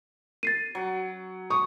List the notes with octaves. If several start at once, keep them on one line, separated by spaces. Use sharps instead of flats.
A6 C7 D#7
F#3
C#6 D#6